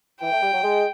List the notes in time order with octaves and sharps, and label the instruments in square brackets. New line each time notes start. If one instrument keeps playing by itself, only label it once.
[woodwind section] E3 [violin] G5
[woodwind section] A3
G3
F#3
G#3